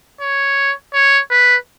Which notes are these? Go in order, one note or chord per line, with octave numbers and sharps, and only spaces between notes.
C#5
C#5
B4